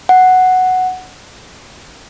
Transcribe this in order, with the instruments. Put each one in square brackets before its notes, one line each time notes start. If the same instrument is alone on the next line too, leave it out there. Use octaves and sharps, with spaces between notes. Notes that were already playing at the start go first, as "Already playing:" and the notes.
[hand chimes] F#5